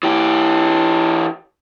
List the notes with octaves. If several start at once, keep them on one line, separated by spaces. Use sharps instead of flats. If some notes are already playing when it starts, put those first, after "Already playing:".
E3 G4